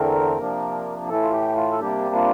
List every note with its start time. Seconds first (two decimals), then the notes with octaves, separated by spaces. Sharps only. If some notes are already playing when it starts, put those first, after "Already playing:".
Already playing: E2 D3 A3 C4 A#4
0.37 C3 F3 A#3 D4
1.09 A2 E3 A3 A4
1.23 F4
1.32 G4
1.56 F4
1.72 A4
1.81 C3 G3 A#3 D4 G4
2.15 F4